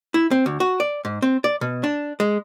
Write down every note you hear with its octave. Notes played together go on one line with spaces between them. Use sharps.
E4
C4
D2
F#4
D5
G#2
C4
D5
B2
D4
G#3